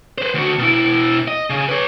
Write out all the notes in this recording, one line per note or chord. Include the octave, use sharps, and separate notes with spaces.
B4 C5
D2 F#4
B2 E4
D#5
C#3 G#4
B4 C#5